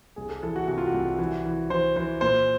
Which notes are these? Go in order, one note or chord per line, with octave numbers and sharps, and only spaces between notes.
C2 G#4
A4
E3 A4
F#4
C3 F#4
F4
F#4
C2
E3
E3
E3 C5
E3 C5
A#2 C5